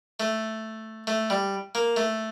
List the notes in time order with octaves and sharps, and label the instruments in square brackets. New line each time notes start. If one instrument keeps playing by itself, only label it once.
[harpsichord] A3
A3
G3
A#3
A3